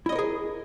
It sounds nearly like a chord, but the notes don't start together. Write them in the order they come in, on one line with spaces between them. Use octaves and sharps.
E4 D#5 C#5 A#4 G#4